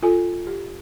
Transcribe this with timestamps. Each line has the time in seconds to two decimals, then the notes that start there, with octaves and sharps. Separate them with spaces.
0.03 F4 A4 G#5
0.47 G4